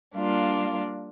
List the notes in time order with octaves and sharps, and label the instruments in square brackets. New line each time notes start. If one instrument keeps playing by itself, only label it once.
[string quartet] G3 A#3 D4 F4